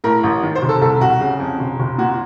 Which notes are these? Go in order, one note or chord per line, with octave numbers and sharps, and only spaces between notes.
A2 A#4
A1
D#3
C5
F1
A4
C2 A4
C2 F#4
C#3
F2
F1
F1
A#2 F#4